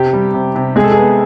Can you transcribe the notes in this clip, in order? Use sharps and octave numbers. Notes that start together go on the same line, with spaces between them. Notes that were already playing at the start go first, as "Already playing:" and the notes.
Already playing: C3 G4
G3
C3
C3
G#3 G#4
A4
G#4
B3